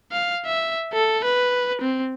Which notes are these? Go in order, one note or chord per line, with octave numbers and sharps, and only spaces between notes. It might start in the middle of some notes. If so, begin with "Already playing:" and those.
F5
E5
A4
B4
C4